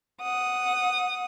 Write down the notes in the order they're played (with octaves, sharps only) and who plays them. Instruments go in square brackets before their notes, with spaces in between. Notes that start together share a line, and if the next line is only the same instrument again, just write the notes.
[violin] F#5 D#6